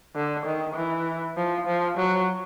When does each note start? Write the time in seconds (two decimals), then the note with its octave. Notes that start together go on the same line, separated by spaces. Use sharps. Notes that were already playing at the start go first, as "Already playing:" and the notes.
0.15 D3
0.46 D#3
0.76 E3
1.37 F3
1.67 F3
1.97 F#3